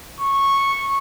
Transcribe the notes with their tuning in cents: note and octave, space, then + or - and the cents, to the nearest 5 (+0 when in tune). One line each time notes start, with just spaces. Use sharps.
C#6 -10